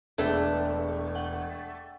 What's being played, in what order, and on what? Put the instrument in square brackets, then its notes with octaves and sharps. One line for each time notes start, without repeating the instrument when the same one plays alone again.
[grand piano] E1 [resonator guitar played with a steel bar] A3 [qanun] D4 B4 [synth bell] G#4 G5
[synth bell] F#5 G5